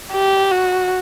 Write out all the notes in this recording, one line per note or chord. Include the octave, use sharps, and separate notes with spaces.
G4
F#4